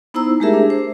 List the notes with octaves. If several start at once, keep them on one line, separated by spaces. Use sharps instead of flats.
B3 D#4 E4 C5 A#5 E6
G#3 A3 G4 G#4 A#4 E5
D4
C5